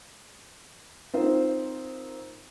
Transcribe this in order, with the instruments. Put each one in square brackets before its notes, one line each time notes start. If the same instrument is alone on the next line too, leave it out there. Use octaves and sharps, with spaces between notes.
[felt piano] C4 D#4 F4 A#4 C5